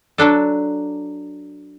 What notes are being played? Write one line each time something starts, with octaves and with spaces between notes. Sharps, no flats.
F#3 D4 A4